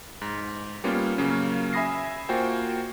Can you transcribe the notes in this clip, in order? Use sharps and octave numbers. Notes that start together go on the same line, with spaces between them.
G#2
G3 A#3 B3 C#4 F4
C#3 F#3 A#3 C#4
E5 G#5 B5 D#6 A#6 C7
A#3 F4 F#4 C5 G5 G#5